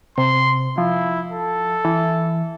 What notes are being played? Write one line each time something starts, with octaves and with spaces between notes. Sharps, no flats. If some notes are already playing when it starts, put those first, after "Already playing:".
C3 C6
F3 E4
A4
E3